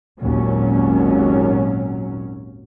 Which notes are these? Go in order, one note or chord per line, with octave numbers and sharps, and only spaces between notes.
G#1 D#2 A#2 F#3 C#4